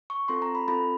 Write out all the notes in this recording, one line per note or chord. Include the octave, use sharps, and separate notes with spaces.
C#6
C4 F4 A4 C6
A#5
B5
C4 F4 A4 B5